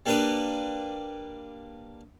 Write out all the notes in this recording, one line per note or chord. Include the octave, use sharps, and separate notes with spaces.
G3 A#3 D4 G4 B4 D#5